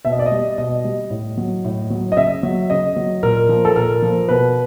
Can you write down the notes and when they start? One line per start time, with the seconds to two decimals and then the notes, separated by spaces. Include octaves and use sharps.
0.05 B2 E5
0.12 D#5
0.19 D5
0.26 D#5
0.31 G3
0.58 B2 D#5
0.85 G3
1.10 A2
1.37 F#3
1.65 A2
1.90 F#3
2.12 D#5
2.17 C#3 E5
2.43 F#3
2.70 C#3 D#5
2.96 F#3
3.23 A#2 A#4
3.49 F3
3.65 A4
3.76 A#2 A#4
4.02 F3
4.29 B2 B4